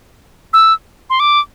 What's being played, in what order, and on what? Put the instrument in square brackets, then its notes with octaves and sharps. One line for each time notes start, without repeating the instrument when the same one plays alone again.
[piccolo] E6
C6
D6